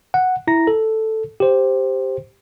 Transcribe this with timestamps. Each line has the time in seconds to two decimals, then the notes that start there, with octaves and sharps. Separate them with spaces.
0.14 F#5
0.47 E4 A#5 A#6
0.67 A4
1.40 G4 C5